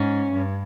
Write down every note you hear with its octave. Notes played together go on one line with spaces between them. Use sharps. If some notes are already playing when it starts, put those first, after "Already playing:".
Already playing: G#2 C#4
G2